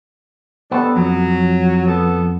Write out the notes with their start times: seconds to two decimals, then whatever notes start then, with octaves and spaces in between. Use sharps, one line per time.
0.72 G3 B3 D4 A4
0.96 F2 F#3
1.87 B3 A4